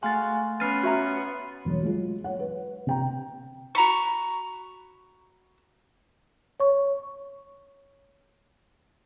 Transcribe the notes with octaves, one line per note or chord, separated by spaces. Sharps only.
G#3 A3 F#4 F5 G#5 C6 A6
B3 C#4 B5 F6 A6 C7 D#7
F#4 E5 A#5
E1 F#3 C#5
F#3 G#3 F4
C#5 F#5
B4
C3 G5 A#5
F#4 A#5 B5 C#6
C#5 C#6